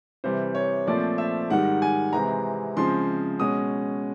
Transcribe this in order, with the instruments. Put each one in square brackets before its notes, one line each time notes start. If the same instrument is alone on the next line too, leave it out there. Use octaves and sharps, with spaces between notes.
[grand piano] C3 E3 G3 C5
C#5
A#2 F3 A3 C4 D5
E5
G#2 D#3 G3 F#5
G#5
C3 E3 G#3 C4 A#5
C#3 F3 G#3 C4 C6
B2 G#3 C#4 D#6